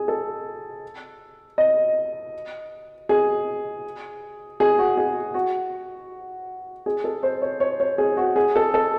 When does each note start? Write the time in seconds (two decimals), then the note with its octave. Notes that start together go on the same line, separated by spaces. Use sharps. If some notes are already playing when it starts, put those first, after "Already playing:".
Already playing: G#4
0.08 A4
1.58 D#5
3.09 G#4
4.60 G#4
4.79 F#4
4.97 G#4
5.34 F#4
6.86 G#4
7.04 A4
7.23 C5
7.42 C#5
7.60 C#5
7.80 C#5
7.98 G#4
8.17 F#4
8.36 G#4
8.56 A4
8.74 A4